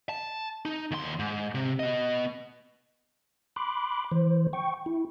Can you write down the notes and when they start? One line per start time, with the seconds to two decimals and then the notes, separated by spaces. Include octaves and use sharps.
0.09 A5
0.65 D#4
0.91 D#2 C6
1.19 G#2
1.55 C3
1.80 B3 D#5
3.56 B5 C6 D6 F#6
4.12 E3 C5
4.53 G5 C#6
4.86 E4